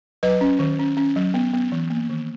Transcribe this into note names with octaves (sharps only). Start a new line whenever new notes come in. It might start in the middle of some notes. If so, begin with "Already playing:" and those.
F#3 B4 D#5
C#4
D#3
C#4
C#4
F#3
B3
B3
E3
A#3
D#3